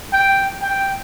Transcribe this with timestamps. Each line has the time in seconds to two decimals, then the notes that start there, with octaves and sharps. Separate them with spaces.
0.13 G5
0.62 G5